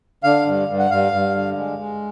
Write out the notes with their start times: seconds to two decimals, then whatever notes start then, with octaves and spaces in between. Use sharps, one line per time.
0.24 D3 F5
0.47 G2
0.68 G2
0.79 F#5
0.90 G2 F5
1.12 G2
1.35 D3
1.56 G#3
1.79 G#3